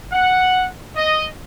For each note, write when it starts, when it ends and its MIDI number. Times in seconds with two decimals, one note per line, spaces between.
0.12 0.65 78
0.96 1.25 75